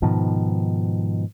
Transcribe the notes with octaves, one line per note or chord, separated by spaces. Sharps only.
G#2 B2 D#3 F3